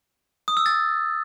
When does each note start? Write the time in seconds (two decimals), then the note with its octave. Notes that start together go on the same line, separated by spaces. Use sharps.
0.48 D#6
0.57 E6
0.66 A6